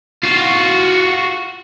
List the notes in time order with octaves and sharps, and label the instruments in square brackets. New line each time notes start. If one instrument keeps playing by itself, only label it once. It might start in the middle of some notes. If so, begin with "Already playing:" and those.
[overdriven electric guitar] F4 F#4